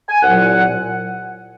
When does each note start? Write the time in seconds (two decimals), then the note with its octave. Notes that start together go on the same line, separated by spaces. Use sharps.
0.09 G#5
0.23 C2 A#2 F#3 F#5